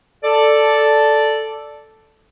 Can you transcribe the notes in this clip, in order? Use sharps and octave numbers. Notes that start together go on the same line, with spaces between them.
A4 D5